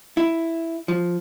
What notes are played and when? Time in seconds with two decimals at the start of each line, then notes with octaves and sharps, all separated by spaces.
0.17 E4
0.88 F3